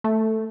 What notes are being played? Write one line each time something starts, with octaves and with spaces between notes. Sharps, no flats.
A3